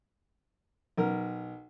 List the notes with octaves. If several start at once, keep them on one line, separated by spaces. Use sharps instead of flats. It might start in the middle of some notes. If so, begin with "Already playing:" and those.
B1 A#4